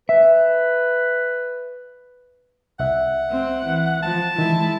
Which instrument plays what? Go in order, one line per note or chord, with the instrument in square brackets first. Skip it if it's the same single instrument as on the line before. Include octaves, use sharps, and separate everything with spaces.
[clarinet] B4 [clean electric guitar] E5
[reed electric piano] C2 E5 [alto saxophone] F#5
[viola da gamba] C4
E3
[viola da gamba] F3 [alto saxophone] A5
[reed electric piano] D#3 E3 [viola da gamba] G#3 E4